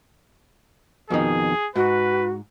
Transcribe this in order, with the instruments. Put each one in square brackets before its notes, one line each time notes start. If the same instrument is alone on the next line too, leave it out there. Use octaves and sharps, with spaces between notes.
[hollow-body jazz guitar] F2 B2 D#3 [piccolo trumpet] G#4
[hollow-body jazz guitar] G#2 [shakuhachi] F#4 [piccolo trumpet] B4